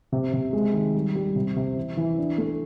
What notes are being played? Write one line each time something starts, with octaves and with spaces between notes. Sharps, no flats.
C3
C3
G#3
D#3
G3
G3
C3
C3
E3
E3
D4
A3